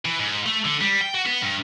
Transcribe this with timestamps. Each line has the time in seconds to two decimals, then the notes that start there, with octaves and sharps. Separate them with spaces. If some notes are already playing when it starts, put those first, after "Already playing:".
0.05 E3
0.20 G#2
0.46 A3
0.65 D3
0.81 G3
1.02 G5
1.15 F#4
1.26 B3
1.42 G2